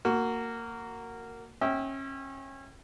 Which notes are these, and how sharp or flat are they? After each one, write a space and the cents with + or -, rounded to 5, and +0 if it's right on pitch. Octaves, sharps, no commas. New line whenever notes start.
A#3 -15 F#4 +0
C#4 -30 E5 -30 G5 -15